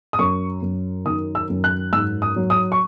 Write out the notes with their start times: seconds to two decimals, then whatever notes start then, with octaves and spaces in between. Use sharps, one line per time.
0.13 D#6
0.19 F#2 C#6
0.62 F#2
1.05 D#3 D#6
1.35 E6
1.50 F#2
1.64 F#6
1.93 G#2 E6
2.22 D#6
2.36 F#3
2.50 D#6
2.72 C#6